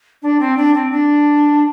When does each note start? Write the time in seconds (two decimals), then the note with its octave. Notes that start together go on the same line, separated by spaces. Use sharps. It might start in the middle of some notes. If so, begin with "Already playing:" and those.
0.22 D4
0.40 C4
0.57 D4
0.74 C4
0.92 D4